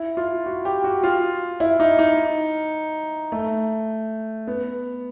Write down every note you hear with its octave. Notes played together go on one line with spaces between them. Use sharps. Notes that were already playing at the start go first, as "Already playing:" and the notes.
Already playing: E4
F4
F#4
G4
F#4
F4
E4
D#4
D#4
A3
B3